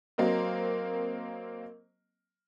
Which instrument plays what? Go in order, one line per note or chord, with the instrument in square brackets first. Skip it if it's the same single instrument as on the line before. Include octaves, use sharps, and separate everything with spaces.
[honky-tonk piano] F#3 A#3 C4 A#4 D#5